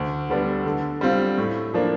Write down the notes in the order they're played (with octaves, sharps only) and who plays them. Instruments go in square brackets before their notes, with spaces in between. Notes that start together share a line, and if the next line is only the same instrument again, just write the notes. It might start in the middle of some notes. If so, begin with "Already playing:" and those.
Already playing: [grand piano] D2
D3 G3 B3 D4
D3
G3 C4 F4
A2
F3 A#3 D4